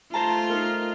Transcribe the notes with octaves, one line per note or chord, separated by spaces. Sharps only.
A3 F4 C5 A5 A#5
D#4 A#4